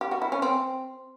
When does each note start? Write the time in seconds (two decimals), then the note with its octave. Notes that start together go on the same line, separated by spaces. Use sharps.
0.01 G4
0.11 F#4
0.22 E4
0.32 C#4
0.42 C4